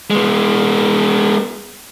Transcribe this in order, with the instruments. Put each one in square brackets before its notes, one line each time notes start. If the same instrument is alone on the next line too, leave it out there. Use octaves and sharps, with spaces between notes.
[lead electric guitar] G#3 B3